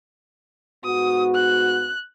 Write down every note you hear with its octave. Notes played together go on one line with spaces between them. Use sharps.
G#2 B3 F#4 D#6
F#6